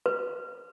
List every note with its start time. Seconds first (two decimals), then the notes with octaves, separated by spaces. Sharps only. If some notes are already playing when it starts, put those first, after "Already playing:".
0.06 B4